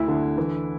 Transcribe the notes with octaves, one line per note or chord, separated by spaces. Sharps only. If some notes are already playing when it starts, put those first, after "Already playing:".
Already playing: D2 E4
D3
E3